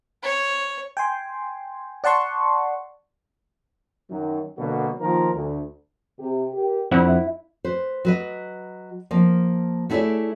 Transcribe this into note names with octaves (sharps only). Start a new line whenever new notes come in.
C#5
G5 G#5 C6
D5 F#5 A5 C6 C#6
F#2 D#3
B2 D3 F#3 A#3 F#4
D#3 F3 A#3 F4 A#4
D2
C3 G4
G4 A#4
F2 C4 D4 E4 F#5
B4 C5
F#3 B4 D#5
F3 A#3
A3 B3 E4 G#4 C#5 D5